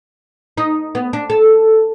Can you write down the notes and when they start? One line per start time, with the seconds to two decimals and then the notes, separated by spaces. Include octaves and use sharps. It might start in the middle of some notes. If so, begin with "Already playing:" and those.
0.58 D#4
0.95 B3
1.13 D4
1.30 A4